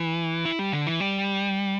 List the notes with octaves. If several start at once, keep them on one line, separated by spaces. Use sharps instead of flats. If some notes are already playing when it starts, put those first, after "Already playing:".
Already playing: E3
E4
G3
D3
E3
G3